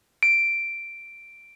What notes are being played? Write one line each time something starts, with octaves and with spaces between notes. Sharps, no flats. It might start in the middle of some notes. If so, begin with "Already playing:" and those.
D7